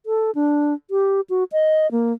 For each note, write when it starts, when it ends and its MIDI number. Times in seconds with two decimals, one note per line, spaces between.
0.06 0.31 69
0.35 0.74 62
0.91 1.21 67
1.30 1.44 66
1.52 1.90 75
1.91 2.13 58